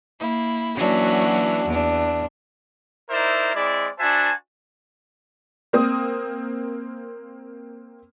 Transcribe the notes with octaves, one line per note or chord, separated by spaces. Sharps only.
A#3 E4
E3 F#3 A#3 C#4 D4 F#4
E2 D4
D#4 E4 A#4 C5 D5 E5
G#3 C4 E4 D5
D4 F#4 C5 E5 G#5 A5
A#3 C4 D#6